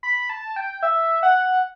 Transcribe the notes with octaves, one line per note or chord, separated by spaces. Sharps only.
B5
A5
G5
E5
F#5